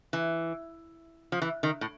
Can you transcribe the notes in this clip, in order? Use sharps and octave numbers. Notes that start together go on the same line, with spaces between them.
E3
F3
E3
D#3
A2